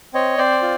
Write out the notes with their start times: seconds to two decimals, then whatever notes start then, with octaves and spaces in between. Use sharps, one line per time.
0.14 C4 C#5 D#5
0.38 C4 C5 D5
0.62 F4